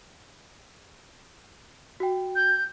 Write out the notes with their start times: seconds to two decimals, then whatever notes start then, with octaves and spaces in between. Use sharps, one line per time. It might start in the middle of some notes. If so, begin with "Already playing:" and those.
2.00 F#4 G5
2.35 G6